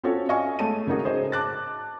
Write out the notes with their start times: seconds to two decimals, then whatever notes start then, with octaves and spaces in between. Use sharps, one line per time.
0.03 C4 C#4 F4 F#4 A4 C#5
0.29 D#5 F5 G#5 C#6
0.59 G#3 A3 C#5 A5 D#7
0.87 C#3 A#3 D#4 F#4 G#4
1.05 G#4 C5 C#5 D#5
1.32 A5 D6 F#6 A6